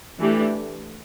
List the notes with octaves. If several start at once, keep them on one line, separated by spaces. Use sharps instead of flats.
E3 A3 D4 G4